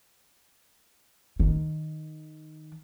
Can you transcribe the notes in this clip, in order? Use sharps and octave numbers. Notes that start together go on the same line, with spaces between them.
D#3